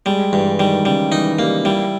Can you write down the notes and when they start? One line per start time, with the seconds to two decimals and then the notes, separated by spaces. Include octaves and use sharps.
0.06 G3 G#3
0.32 G2 E3
0.59 D#3 G3
0.85 C#3 G3
1.12 E3 D#4
1.38 G3 A#3
1.65 G3 E4